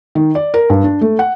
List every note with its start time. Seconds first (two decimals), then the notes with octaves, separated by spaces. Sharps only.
0.15 D#3
0.35 D5
0.54 A#4
0.70 G2
0.84 D4
1.01 A3
1.19 F#5